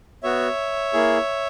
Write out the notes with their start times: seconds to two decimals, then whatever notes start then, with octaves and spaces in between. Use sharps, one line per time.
0.23 B3 F#4 C#5 E5
0.93 A#3 E4 G#4